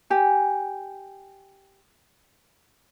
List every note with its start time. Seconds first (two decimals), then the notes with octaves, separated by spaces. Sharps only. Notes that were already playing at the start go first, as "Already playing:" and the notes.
0.10 G4 G#5